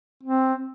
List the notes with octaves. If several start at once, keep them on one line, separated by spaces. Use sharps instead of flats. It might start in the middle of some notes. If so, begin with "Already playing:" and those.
C4